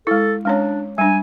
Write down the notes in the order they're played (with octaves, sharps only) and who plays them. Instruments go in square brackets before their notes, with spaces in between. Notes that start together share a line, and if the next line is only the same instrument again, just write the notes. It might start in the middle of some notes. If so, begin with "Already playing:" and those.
[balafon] G#3 E4 [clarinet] A4
[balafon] G#3 C#4 C#5 [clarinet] D4
[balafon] G3 D4 [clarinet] G#5